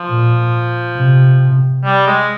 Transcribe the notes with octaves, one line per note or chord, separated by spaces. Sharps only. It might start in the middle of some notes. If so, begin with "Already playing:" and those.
Already playing: F3
A#2
C3
G3
G#3